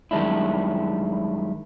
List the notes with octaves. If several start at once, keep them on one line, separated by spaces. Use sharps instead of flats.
F#2 D#3 G3 G#3 D4 E4